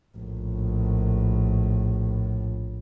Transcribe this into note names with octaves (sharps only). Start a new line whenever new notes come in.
A#1 A2